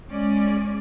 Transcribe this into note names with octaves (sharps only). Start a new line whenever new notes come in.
G#3 C#4 D5